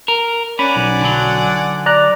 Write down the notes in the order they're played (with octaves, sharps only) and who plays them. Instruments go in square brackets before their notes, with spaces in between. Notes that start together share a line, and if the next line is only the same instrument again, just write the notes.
[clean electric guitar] A#4
[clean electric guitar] C#4 [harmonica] D5 F#5 G#5 [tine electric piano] B5
[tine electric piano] B1
[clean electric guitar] D3 F#3
[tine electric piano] D5 A#5 F#6